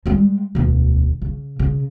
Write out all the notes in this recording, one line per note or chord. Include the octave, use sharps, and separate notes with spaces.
G3 G#3
E1 D2
C#3
C#3